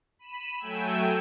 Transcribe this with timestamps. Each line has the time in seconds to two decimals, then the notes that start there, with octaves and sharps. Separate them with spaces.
0.19 B5 D#7 E7
0.58 F#3 A3 G5 G#5 E6